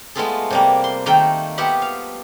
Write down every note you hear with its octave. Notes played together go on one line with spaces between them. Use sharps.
G#3 A3 B3 F4 G#4 A4
C3 G3 A#3
C6
D#3 A3 A#3 A4 G5
B3 F4 G4 E5 F#5 B5
F5